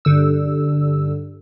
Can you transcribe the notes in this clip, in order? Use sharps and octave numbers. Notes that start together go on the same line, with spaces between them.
G2 D3 E6